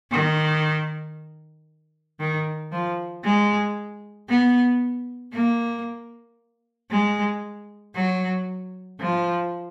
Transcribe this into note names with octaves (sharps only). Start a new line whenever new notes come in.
D#3
D#3
F3
G#3
B3
A#3
G#3
F#3
F3